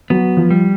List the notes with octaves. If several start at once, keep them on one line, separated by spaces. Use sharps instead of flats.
F#3 B3
F3
G3